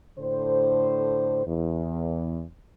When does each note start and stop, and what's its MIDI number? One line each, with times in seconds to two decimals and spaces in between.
0.19 1.46 45
0.19 1.46 50
0.19 1.46 72
1.47 2.43 40